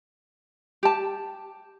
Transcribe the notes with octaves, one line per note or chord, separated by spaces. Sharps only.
G4 A5